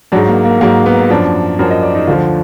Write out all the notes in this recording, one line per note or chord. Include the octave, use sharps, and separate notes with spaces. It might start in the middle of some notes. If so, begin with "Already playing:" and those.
G#2 F#3 D4
A#3
A#3
G#2 F#3 A#3
B3
F#2 F3 D4
F#2 F3 A#4
D#5
D5
D#4
D2 D3 F3 F4